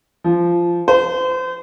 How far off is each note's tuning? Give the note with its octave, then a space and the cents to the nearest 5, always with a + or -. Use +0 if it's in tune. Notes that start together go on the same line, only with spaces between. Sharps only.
F3 -15
C5 -35